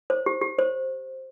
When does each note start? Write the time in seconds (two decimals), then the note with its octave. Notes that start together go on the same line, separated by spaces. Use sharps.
0.10 C5
0.26 G4
0.41 G4
0.59 C5